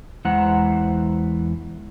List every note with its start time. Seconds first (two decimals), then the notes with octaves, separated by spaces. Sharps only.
0.25 E2 E3 G#3 C5 F#5 A#5